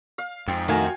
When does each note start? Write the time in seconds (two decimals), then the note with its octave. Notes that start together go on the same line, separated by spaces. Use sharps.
0.18 F5
0.48 F2 G#2 G5
0.68 D#3 A3 D#4 F#4 F5 G5 G#5